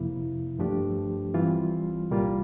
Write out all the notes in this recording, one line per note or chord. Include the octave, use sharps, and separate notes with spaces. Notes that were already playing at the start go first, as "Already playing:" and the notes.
Already playing: F2 C3 F3 A#3 E4
G2 F3 A3 D4 G4
E3 G3 C4 F4
C2 A#2 G3 A#3 F4